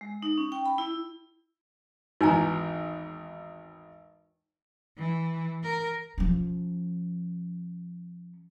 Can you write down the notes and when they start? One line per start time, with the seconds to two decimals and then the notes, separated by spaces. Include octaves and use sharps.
0.01 G#3
0.23 D#4
0.38 C#4
0.52 G5
0.66 B5
0.78 E4
2.21 G#1 E2 D#4 G#5 A#5
4.98 E3
5.64 A#4
6.18 F3 C#4